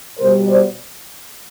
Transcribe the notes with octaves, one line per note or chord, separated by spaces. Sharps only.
B2 G3 A#4 C5
C5 D5